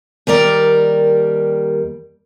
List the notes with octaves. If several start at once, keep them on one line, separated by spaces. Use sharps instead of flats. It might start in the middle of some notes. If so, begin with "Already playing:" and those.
D#2 G3 A#4 D5